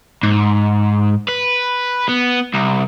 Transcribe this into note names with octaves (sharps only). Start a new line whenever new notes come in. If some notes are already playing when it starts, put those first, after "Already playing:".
G#2
B4
B3
C2